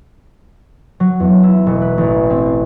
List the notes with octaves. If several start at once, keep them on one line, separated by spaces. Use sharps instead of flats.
F#3
E2
E4
E1
B4
A1
C4